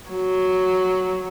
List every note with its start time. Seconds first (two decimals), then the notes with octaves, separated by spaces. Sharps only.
0.10 F#3